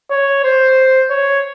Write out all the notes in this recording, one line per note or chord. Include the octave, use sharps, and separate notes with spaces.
C#5
C5
C#5